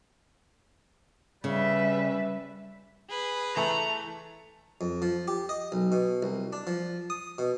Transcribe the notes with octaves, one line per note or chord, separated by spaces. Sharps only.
C#3 G3 B4 E5
G#4 B4
E3 A3 A5 A#5
F2
F3
G4
D#5
B1
B2
C2
D4
F3
D#6
B2